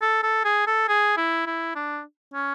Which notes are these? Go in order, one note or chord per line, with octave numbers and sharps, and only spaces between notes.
A4
A4
G#4
A4
G#4
E4
E4
D4
C#4